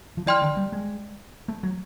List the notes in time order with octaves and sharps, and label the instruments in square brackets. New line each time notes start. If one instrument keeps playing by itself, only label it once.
[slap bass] F3
[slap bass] E3 [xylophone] D5 G5 C6 F6
[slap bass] D3
G3
G#3
A3
F#3